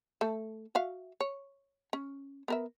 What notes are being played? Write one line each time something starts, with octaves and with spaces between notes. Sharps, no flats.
A3 A4
F#4 E5 F5
C#5
C#4
B3 A#4 E5